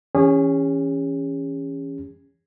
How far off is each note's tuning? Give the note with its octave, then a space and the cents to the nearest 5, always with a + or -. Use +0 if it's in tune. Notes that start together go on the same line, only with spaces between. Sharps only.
E3 +0 C#4 +0 G#4 -40